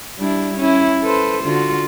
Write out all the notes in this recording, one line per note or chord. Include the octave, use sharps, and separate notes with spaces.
G3 D4 E4
C#4 E4
A4 B4 C5
D3 F4 F#4